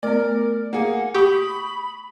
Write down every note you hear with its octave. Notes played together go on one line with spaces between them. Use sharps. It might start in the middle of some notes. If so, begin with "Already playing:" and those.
A3 B3 A#4 D5
A#3 G#4 F#5
G4 B5 C#6 D#6